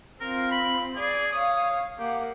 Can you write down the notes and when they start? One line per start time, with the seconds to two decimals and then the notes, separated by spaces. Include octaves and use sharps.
0.20 C4 F4 A#4
0.51 B5
0.96 G#4 D5
1.32 C#5 F5 D#6
1.99 A#3 G4 F#5